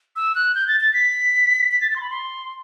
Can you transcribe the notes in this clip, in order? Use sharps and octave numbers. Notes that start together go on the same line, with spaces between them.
E6
F#6
G6
A6
A6
B6
B6
A6
A6
C6
B5
C6